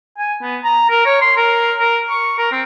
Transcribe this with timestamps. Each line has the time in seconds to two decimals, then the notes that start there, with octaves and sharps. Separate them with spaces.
0.18 G#5
0.42 B3
0.64 A#5
0.90 A#4
1.05 C#5
1.21 C6
1.37 A#4
1.78 A#4
2.10 C#6
2.38 A#4
2.52 C4